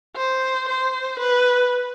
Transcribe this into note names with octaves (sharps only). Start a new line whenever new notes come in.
C5
C5
B4